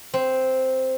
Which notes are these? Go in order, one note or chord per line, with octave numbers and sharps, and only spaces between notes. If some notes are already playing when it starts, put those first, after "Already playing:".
C4